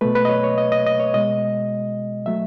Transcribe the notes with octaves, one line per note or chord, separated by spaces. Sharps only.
B2 A3 B4
B4
D#5
C#5
C#5
D#5
D#5
D#5
C#5
B2 G#3 D#5
F#3 A3 E5